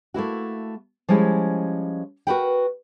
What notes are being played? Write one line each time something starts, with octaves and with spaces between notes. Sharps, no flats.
A3 A#3 E4 F#4
F3 G3 G#3 C#4 E4
F#4 G4 A#4 B4 F#5 G5